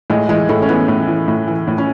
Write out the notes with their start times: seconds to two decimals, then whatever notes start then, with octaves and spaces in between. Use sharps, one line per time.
0.10 A2 G#3
0.29 E3 G#3
0.49 A2 A3
0.62 C#4
0.68 E3 B3
0.88 A2
1.08 E3
1.28 A2
1.48 E3
1.68 A2
1.78 C#4